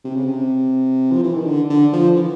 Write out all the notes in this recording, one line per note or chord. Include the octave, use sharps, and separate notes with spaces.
C3
C#3
C3
F3
E3
D#3
D3
D3
F3
E3